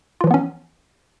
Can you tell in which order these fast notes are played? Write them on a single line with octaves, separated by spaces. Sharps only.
F4 E3 F3 B3 C#4